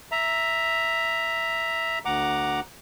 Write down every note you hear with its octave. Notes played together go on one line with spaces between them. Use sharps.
E5 A#5
D2 F#5 A#5 D6